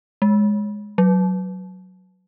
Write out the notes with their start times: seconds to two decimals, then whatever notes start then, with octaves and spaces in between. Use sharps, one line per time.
0.22 G#3
0.98 F#3